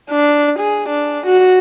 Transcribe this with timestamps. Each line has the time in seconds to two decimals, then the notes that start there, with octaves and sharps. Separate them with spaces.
0.10 D4
0.59 G#4
0.89 D4
1.27 F#4